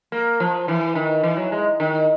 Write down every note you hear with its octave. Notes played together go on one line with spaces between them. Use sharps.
A#3
F3
E3
D#3
E3
F#3
G#3
D#3